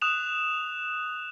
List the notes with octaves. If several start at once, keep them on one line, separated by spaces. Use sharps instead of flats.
D#6 F#6 E7 F7